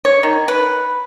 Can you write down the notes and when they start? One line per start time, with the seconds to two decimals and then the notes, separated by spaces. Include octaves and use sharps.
0.05 C#5
0.23 D#3
0.48 B4